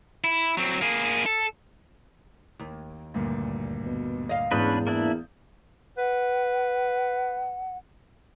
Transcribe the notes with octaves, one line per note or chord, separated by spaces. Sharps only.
E4
F#3 C4
A#3 G#4
A4
D#2
D2 G2 A#2
B2
D#5 F5
E2 G#2 C#4 D4 B4 D#6 G6
A#3 D4 E4
B4 F#5